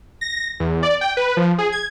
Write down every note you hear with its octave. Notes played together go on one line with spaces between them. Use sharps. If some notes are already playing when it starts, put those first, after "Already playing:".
A#6
E2
D5
G5
B4
F3
G#4
G#6